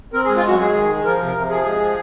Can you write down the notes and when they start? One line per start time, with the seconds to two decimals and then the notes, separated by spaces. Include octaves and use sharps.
0.13 C4 A#4
0.25 G#4
0.29 G#3
0.36 F4
0.44 F#2 F#4
0.59 G#3 G#4
0.74 D#3
0.89 G#3
1.04 F3 A#4
1.19 C3
1.27 A#4
1.35 C3
1.49 F3 G#4
1.65 G#3
1.80 F3